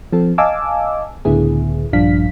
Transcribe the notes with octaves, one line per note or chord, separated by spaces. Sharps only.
F3 C4 A4
D#5 F5 G#5 A5 D6 E6
C#2 A2 D3 B3 E4 G#4
A#1 G2 F3 D4 F5 B6